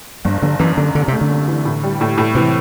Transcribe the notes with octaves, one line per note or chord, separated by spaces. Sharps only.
G1 G2
G1 D3
F#2 E3
F#2 D3
C2 D3
C3 A3
D3
C2
E3
A2
G3
A2
A2
C3 E3